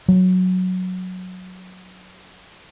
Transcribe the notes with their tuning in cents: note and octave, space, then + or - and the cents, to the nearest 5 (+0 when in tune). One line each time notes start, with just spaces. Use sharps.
F#3 -5